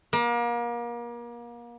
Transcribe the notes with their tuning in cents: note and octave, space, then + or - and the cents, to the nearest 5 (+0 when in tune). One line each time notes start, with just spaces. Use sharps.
A#3 +35